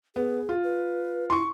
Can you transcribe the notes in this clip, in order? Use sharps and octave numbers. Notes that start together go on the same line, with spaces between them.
B3 G#4
F4
B4
E4 C6 C#6